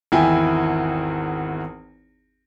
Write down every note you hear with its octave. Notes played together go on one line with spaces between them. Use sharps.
G#1 E2 E4 G5 G#5